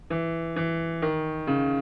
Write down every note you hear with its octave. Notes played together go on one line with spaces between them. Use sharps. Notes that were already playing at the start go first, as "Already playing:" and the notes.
E3
E3
D#3
C#3